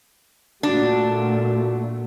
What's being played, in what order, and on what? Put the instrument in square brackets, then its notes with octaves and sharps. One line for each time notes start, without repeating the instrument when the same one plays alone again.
[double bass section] A#2 A3 [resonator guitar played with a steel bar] D4 [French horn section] F#4